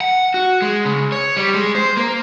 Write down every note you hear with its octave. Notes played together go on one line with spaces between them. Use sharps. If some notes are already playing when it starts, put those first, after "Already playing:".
F#5
F#4
G#3
C#3
C#5
G3
G#3
C5
A#3